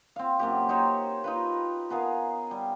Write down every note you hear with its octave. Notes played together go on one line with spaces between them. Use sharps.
C4 F5
F#2 A#3 G4
D#4 G4 C5 C#5
D#4 F4 B4
B3 G#4 A#4 F5
G3